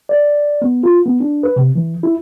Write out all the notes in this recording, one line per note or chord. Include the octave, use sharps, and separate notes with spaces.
D5
B3
F4
B3
D4
B4
C3
E3
E4